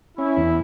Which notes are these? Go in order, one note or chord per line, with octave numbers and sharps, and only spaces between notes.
C#4 E4
E2